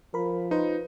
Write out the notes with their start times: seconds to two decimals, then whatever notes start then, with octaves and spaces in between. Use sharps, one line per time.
0.14 F3 A#4 B5
0.51 D#4 F4 B4 C5